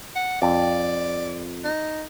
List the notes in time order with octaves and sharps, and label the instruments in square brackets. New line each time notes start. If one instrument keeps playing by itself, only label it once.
[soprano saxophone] F#5
[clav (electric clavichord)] F2 [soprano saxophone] D5
[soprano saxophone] D#4